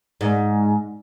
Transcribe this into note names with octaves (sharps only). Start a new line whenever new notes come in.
G#2